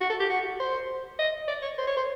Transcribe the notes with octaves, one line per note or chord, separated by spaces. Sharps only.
F#4
A4
G4
F#4
C5
D#5
D5
C#5
C5
C#5
C5